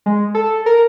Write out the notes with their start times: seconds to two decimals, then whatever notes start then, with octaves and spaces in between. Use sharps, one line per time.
0.06 G#3
0.34 A4
0.66 A#4